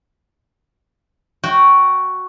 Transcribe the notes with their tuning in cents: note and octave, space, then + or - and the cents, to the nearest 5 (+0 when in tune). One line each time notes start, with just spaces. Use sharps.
F#4 +0 G5 -10